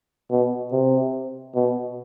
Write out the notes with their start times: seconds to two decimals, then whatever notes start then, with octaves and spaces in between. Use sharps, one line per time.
0.30 B2
0.72 C3
1.55 B2